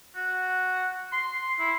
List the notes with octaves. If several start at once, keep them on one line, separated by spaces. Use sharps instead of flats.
F#4
C6
E4